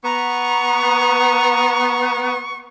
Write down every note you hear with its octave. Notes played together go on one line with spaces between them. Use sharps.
B3 A#5 C#6